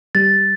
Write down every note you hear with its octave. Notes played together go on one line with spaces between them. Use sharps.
G3 A6